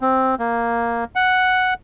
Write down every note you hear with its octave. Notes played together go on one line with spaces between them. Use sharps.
C4
A#3
F#5